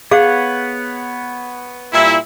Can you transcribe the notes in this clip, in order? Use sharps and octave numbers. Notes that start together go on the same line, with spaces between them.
B3 G#4 C#5 F5 F#5
A#2 G3 E4